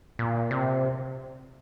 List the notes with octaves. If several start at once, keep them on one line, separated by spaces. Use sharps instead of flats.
A#2
C3